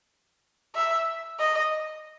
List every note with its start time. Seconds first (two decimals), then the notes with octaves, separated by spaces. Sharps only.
0.75 E5
1.39 D#5